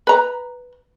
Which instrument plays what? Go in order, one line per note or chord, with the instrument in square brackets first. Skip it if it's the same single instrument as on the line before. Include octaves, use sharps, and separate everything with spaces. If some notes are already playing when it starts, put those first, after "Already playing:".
[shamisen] B4 A#5